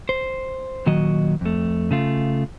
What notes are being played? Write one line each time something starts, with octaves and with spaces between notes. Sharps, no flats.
C5
A#2 D#3 F#3 F#4 D#5
F2 A3
C#3 A3 F4